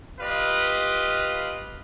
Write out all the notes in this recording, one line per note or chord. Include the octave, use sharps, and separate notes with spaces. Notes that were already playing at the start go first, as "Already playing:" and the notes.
F4 G4 B4 D#5 F5